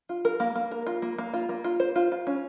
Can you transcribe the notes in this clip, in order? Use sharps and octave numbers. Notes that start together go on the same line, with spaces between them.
F4
A#4
A#3
A#3
A#4
F4
A#3
A#3
F4
A#3
F4
C5
F4
F4
C#4